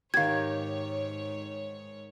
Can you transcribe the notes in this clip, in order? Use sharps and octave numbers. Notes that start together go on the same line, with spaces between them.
G#2 D#3 G4 C#5 F5 G#6